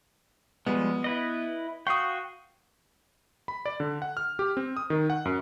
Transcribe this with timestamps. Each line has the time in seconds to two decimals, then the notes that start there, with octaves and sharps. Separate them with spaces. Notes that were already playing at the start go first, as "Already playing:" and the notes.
0.67 F3 G3 G#3 B3
1.04 E4 B4 D#5
1.87 F#4 F5 G5 C#6 D#6
3.48 B5
3.66 D5
3.80 D3
4.02 F#5
4.17 F6
4.39 G4
4.57 C4
4.77 D#6
4.90 D#3
5.10 F#5
5.25 F#2